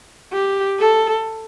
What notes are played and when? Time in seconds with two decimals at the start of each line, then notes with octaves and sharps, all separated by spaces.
0.33 G4
0.79 A4